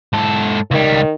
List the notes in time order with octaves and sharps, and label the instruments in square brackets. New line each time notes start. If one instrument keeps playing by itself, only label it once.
[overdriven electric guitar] G#2 A4
[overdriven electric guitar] C#2 G3 [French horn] D#3